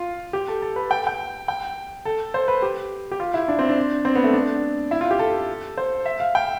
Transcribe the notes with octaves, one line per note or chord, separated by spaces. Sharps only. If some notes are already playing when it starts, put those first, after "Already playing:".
Already playing: F4
G4
A4
A4
B4
G5
G5
G5
A4
C5
B4
G4
G4
F4
E4
D4
C4
D4
C4
B3
A3
D4
E4
F4
G4
A4
C5
E5
F5
G5